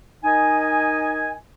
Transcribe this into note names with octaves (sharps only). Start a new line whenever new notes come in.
D#4 A#4 D#5 G#5